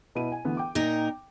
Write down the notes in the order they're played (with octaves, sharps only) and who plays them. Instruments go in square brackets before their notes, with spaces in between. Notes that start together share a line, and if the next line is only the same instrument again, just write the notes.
[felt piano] B2 E4 D#7
G#5
D2 E3 B3
G5 D6
[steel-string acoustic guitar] A#2 D#4 A#4